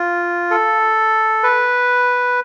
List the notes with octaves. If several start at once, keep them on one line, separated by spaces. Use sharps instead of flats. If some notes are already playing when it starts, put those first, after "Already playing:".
Already playing: F4
A4
B4